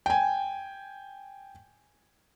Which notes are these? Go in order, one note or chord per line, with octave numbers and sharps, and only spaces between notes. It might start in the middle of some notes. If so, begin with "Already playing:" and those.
G5 G#5